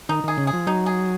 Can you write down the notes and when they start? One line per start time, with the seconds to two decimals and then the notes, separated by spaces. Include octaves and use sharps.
0.09 D#3 D#4
0.24 D#3 G#4
0.38 C#3
0.47 G#4
0.53 F3
0.67 F#3 D#4
0.86 G#4